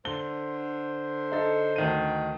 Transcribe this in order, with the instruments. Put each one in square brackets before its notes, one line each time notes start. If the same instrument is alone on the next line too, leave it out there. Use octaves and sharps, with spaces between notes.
[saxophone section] D3 C5 [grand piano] G7
[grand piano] D#4 A4
D2 D#3 D#7